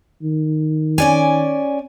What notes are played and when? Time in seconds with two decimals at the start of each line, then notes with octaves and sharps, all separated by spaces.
0.22 D#3
0.98 C#4 D5 G#5